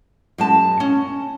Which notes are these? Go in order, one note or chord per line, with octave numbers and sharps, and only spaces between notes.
F#2 G#3 A5
C#4